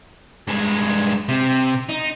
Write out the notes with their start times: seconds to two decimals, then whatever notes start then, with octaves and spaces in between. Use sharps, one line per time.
0.48 G2 G#3
1.29 C3
1.90 D#4